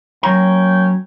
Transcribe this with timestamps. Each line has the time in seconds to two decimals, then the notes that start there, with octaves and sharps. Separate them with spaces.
0.23 F#3 A#3 C#4 G5 A#5